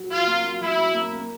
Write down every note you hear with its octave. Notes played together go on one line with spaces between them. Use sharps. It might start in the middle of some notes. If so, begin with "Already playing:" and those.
Already playing: F#3 F#4
F4 F#4
A#3
F#3
F#3 E4
F#3
A#3
A#3